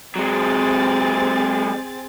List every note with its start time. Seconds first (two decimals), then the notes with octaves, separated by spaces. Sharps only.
0.16 F#3 G#3 C4 G#4 A6